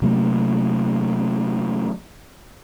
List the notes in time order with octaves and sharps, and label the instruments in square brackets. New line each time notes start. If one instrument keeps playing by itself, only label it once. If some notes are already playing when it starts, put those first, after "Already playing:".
[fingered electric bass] C3 F#3 A3 A#3